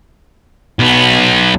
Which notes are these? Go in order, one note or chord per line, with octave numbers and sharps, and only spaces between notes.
B1 B3